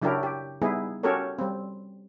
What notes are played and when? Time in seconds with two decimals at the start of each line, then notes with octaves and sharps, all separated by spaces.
0.02 C#3 F#3 D4 E4 G4 A#4
0.23 G4
0.62 G3 B3 D#4 E4 G#4
1.03 C#4 F#4 G4 A4 A#4 C#5
1.39 G3 C4